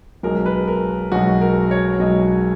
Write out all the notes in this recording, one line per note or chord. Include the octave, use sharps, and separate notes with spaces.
B1 B2 G#3 A#4
B4
A#4
B1 B2 G#3 F#4
A#4
C#5
B1 B2 G#3 D#5